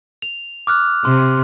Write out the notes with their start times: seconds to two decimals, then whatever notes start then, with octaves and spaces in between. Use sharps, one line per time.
0.22 F7
0.67 D6 F6 F#6
1.05 C3 C6